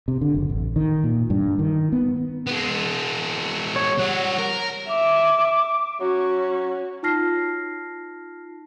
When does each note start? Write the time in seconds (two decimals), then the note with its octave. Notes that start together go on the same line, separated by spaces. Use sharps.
0.08 C3
0.21 D3
0.34 F#1
0.50 A1
0.76 D#3
1.04 A#2
1.30 G2
1.59 D#3
1.92 B3
2.47 G#3 B3
3.76 C#5
3.99 G3 C#5 F#5
4.39 A#4
4.89 E5 D6
6.00 F#3 C#4 F#4
7.03 D#4 F4 A5 F6 A#6 C7